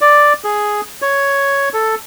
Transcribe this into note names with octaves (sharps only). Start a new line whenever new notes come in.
D5
G#4
C#5
A4